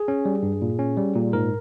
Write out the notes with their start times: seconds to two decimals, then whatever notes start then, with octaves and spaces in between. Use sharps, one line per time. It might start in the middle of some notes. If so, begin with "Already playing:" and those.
Already playing: G#4
0.08 C#4
0.25 G3
0.43 G2
0.62 A#2
0.79 C#4
0.97 G3
1.15 A#2
1.33 G#2 A#4